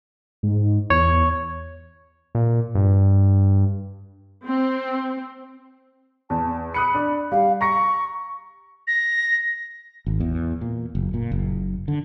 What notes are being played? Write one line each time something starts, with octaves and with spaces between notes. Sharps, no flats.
G#2
E2 C#5
A#2
G2
C4
E2 A5
B5 D#6 F#6 C#7
D4
G3 G4 F5
A#5 C#6 A#6 C#7
A#6
G#1
E2
A#2
F#1
A#2
F#1
D3